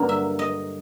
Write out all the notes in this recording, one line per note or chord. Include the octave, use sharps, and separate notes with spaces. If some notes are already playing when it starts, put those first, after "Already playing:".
Already playing: G2 D3 F#3 A#3
E5
D#5